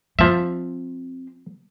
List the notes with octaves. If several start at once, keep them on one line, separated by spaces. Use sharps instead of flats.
F3 C4 E5